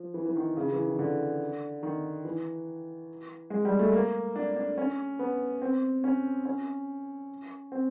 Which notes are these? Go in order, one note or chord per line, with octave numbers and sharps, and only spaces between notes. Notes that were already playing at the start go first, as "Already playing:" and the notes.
Already playing: F3
E3
E3
D#3
C#3
E3
D#3
D3
D#3
E3
G#3
G3
A3
A#3
D4
D4
C#4
B3
C4
C#4
C#4
C4